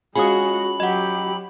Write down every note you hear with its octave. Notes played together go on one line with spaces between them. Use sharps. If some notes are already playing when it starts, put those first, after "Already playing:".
G#3 C#4 F4 F#4 G#4 G#5 B5 D#6
F#3 G4 D#5 F#5